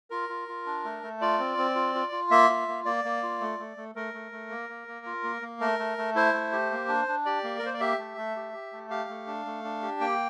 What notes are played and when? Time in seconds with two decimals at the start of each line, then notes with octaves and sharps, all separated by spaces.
0.10 F4 A#4
0.29 F4
0.48 F4
0.66 D4
0.84 A3
1.03 A3
1.21 F4 D5
1.39 C4
1.58 C4
1.75 F4
1.95 F4
2.12 F4
2.31 A#3 E5
2.50 F4
2.68 A#3
2.85 A#3 D5
3.05 A#3
3.23 F4
3.40 A3
3.59 A3
3.77 A3
3.95 A3 A#4
4.14 A3
4.32 A3
4.50 A#3
4.69 A#3
4.88 A#3
5.06 F4
5.24 A#3
5.42 A#3
5.61 A3 A#4
5.79 A3
5.98 A3
6.16 E4 C5
6.33 A3
6.52 G4
6.71 A#3
6.88 D4
7.08 D4
7.25 G4 D5
7.44 A#3
7.59 A#4
7.63 A#3 C5
7.74 D5
7.80 G4 E5
7.99 A3
8.17 A3
8.36 G4
8.53 G4
8.73 A3
8.90 G4 F5
9.09 A3
9.27 D4
9.46 A3
9.64 D4
9.82 G4
10.00 A#3 G5